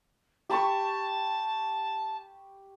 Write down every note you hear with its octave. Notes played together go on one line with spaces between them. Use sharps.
G4 A5 B5 C#6